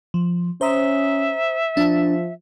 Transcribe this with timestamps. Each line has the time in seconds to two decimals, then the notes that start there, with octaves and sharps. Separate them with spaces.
0.14 F3
0.61 C#4 C5 E5 A#5 D#6
1.77 F3 D4 A5